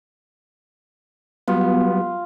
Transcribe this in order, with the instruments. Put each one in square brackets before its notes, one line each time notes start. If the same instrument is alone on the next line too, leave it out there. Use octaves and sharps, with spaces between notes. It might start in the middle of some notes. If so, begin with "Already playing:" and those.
[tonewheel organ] F#3 G3 [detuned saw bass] B3 [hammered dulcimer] F4